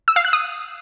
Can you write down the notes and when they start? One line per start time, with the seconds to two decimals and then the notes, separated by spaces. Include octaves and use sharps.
0.08 E6
0.16 F5
0.25 F#6
0.33 D#6